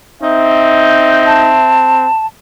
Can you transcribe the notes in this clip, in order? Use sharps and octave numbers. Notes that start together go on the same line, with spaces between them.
C4 D#4 E5
A5